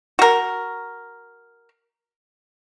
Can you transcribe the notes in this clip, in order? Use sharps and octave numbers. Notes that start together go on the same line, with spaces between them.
F#4 A#4